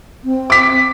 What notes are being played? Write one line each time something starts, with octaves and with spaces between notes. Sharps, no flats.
C4
D6 B6